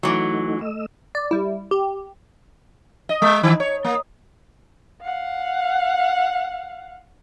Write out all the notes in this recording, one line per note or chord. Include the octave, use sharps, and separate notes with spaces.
E3 F#3 A3 D#4 F#4
A3 D#5 E6
D5
G3 E4
G4
D#5
G#3
D#3
C#5
A#3
F5 F#5